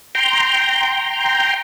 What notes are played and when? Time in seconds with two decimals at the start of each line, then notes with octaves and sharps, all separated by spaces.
0.15 G5 A#5 C6